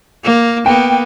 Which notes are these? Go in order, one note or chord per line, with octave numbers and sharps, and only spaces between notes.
A#3
A#3 B3 G5